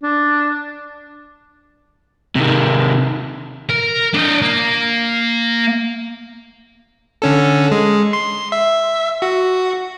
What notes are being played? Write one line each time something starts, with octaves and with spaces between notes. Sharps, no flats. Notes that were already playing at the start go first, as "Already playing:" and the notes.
D4
C3 D#3
A#4
D4 D#5
A#3
D3 C#4 A4
G#3
C6
E5
F#4